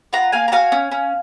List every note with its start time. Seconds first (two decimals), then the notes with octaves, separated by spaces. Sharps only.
0.13 F4 F#5 A#5
0.32 A#3 F5 G#5
0.48 A#5
0.52 F#4 F5 G#5
0.72 C#4
0.92 C#4